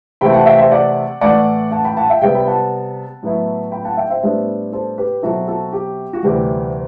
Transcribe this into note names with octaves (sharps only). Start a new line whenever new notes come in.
C3 E3 A3 C4 E4 G5 B5
F#5 A5
E5 G5
C5 E5
D5 F#5
A2 E3 A3 D5 F#5
F#5 A5
G5 B5
F#5 A5
E5 G5
C3 G3 B3 E5 G5
B5
F#5 A5
A2 F#3 B3 E4
G5 B5
F#5 A5
E5 G5
C5 E5
A2 G3 B3 D4 C5 E5
A4 C5
G4 B4
B2 F#3 C4 E4 F#4 A4
F#4 A4
G4
F#4
D2 C3 E3 G3 G4